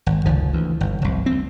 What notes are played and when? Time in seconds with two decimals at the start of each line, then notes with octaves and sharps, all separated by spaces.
0.06 G#1
0.26 F1 C#2 D#3 F3
0.53 D2 E3
0.81 G1
1.02 F1 C2
1.26 D2 C4